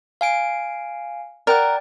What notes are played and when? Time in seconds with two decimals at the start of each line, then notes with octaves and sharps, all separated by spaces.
0.21 F5 G#5 D7
1.47 A#4 D5 F#5 G5